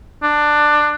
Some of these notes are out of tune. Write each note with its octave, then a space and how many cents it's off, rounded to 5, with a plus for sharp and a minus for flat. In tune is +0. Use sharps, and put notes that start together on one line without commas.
D4 +15